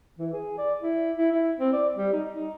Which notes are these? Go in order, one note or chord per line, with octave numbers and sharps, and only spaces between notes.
E3
G#4
D5
E4
E4
E4
C4
D5
G3
D#4
D#4